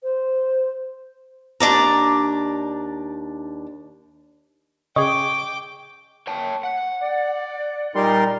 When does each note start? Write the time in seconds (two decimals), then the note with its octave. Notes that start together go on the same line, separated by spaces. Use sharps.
0.03 C5
1.60 D#2 D4 D5 A#5
4.96 C#3 G#4 D#5 G5 C#6 D6
6.27 C#5 G5 A5
6.64 F#5
7.02 D5
7.95 A#2 G3 D#4 A#4 D5 C6